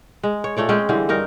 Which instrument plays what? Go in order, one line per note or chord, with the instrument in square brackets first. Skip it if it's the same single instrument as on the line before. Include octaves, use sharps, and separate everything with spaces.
[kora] G#3
C#5
A#2 A3 C#5 D5
G#3 C4 C#4 G5
D3 E3 G3 C4
G2 D#4 A#4